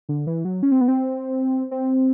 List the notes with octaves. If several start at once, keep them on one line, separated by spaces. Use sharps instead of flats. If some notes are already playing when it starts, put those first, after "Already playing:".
D3
E3
F#3
C#4
C4
B3
C4
C4